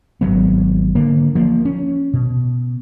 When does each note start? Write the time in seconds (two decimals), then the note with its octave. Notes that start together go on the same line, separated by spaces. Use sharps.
0.21 G#1 F2 F#3 B3
0.95 D3 A#3
1.35 F3 A#3
1.65 C#4
2.14 B2